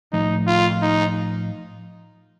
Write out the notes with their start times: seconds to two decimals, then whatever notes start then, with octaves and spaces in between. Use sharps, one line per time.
0.12 A2 F3 A3 D#4
0.47 F4
0.82 D#4